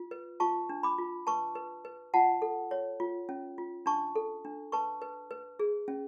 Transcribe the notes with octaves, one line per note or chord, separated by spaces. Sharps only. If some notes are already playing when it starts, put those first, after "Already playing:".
Already playing: F4
B4
F4 A5 C#6
D4
B5 D6
F4
B4 A5 C#6
B4
B4
F4 F#5 A5
A4
C#5
F4
C#4
F4
D4 A5 C#6
A4
D4
B4 A5 C#6
B4
B4
G#4
C#4